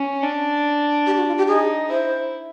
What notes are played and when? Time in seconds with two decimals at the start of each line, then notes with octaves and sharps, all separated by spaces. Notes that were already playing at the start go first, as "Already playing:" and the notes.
Already playing: C#4
0.23 D4
1.06 G4
1.17 F#4
1.27 F4
1.38 G4
1.48 D#4 G#4
1.89 E4 C5